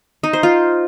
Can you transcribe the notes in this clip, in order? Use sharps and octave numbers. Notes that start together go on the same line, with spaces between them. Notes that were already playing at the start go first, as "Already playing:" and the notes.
D#4
C5
F4